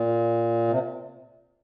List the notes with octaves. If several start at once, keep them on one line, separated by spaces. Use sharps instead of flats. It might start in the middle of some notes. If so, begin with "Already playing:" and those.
Already playing: A#2
C3